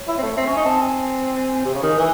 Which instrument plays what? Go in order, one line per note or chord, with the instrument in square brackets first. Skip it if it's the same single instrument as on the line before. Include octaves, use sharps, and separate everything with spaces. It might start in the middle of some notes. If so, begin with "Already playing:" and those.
Already playing: [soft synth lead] C#5
[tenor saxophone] E4
C4
A3
[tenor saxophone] C4 [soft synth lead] E5
[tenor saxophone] C#4
[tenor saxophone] D#4 [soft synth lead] G#5
[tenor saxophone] C4 [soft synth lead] A5
[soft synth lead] G#5
G#5
[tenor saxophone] C3
C#3
D#3
E3